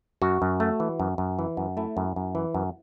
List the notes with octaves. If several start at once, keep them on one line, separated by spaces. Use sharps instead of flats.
F#2 F#4
F#2
A3
E3
F#2
F#2
E3
F#2
A3 E4
F#2
F#2
E3
F#2